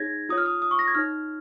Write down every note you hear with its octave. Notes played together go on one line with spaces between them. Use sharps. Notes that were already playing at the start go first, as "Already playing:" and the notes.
Already playing: D#4 G#4 C#5 G#6 A#6
F4 C#5 D#6
F6
D#6
D#6
C#6
A#6
G#6
D#4 C#5 F6